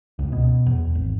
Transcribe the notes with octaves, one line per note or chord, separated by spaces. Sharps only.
C#2
B2
E2
G#1